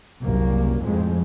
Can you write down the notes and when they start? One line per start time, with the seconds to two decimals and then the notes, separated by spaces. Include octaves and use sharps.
0.21 F#1 C2 A#3
0.82 F2 A2 G#3